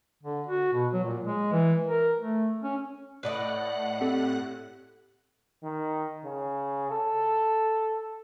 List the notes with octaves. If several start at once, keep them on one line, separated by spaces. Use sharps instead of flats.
D3
F#4
B2
F#3
A#2
G#3
E3
A#4
A3
C#4
A2 B4 D5 D#5 F#5 F#6
C4 G4 A4
D#3
C#3
A4